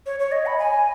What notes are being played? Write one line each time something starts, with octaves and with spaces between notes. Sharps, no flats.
C#5
C#5
D#5
B5
G#5